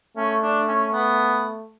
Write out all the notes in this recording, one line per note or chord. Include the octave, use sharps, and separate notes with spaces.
A3 C#4
D4
C#4
B3